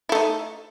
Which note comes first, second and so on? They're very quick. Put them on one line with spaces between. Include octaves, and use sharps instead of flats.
E4 A3 D#4